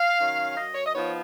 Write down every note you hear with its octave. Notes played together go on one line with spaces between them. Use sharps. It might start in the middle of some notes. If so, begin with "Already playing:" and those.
Already playing: F5
D#3 F#3 C#4
F#2 D#5
C#5
D#5
F3 B3 D#4 C#5